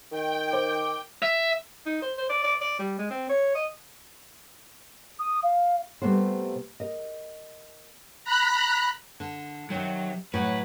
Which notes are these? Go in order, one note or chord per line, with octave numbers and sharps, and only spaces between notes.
D#3 G5
C5 D6
E5
D#4
C5
C5
D5
D5
D5
G3
G#3
C4
C#5
D#5
D#6
F5
C3 G3 A3 B3 C5
A#4 D#5
A#5 B5 F#6
D3
C3 D#3 F#3
A2 F#3 F#4 B4